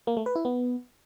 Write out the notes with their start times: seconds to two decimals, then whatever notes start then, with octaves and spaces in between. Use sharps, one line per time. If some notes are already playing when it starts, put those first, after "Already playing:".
0.07 A#3
0.17 A3
0.26 B4
0.35 E4
0.45 B3